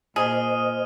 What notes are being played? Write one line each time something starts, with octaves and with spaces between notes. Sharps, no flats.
A#2 G#4 C5 D#5 D#6 F6 D#7